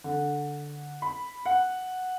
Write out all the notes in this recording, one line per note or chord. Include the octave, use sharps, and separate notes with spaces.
D3
B5
F#5